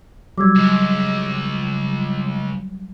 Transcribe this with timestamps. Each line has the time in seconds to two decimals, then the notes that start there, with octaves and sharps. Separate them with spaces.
0.38 F#3 G3 D6 E6 G#6
0.56 C#2